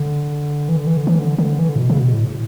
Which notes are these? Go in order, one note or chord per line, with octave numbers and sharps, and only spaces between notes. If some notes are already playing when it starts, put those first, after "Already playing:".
Already playing: D3
E3
D3
E3
D3
E3
D3
D3
E3
D3
A2
B2
C#3
B2
A2